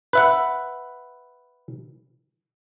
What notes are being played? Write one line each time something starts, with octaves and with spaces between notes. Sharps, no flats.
B4 E5 F#5